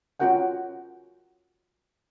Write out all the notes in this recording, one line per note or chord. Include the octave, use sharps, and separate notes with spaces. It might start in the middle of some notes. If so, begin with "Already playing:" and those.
C#4 F4 F#4 A#4 F#5 G5